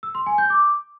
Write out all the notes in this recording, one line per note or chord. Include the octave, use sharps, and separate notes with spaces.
E6
C6
G#5
G6
D6